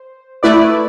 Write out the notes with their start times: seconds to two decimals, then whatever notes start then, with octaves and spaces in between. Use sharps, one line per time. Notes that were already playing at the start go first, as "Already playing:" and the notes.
Already playing: C5
0.43 A3 E4 B4 D5